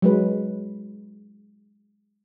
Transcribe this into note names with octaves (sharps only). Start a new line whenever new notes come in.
F#3 G#3 B4